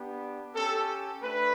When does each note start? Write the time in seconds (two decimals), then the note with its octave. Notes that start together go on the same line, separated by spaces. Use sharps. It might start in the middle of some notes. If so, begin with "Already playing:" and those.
Already playing: B3 D4 G4
0.55 C#4 G4 A4
1.23 A3 D4 B4